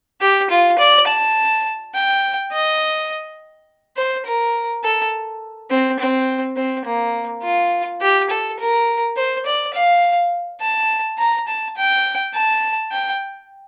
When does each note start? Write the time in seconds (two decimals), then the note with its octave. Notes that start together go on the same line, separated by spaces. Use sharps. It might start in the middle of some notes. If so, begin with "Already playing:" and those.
0.21 G4
0.50 F4
0.78 D5
1.07 A5
1.95 G5
2.52 D#5
3.97 C5
4.26 A#4
4.84 A4
5.70 C4
5.99 C4
6.57 C4
6.85 A#3
7.43 F4
8.01 G4
8.30 A4
8.59 A#4
9.17 C5
9.46 D5
9.74 F5
10.61 A5
11.19 A#5
11.48 A5
11.77 G5
12.34 A5
12.92 G5